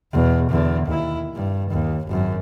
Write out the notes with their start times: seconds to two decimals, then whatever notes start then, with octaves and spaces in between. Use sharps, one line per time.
0.12 E2 B2
0.49 E2 D3
0.86 D#2 E4
1.35 G2
1.70 D#2
2.07 G#1 F#2